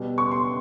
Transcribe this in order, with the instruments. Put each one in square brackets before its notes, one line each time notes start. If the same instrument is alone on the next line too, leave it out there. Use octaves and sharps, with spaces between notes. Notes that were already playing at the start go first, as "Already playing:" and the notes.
Already playing: [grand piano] B2 G3 B3
C#6
C6